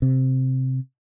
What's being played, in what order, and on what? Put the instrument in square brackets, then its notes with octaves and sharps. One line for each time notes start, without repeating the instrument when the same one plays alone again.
[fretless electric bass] C3